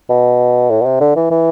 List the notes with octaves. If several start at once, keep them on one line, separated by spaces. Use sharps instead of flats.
B2
A2
B2
C3
D3
E3
E3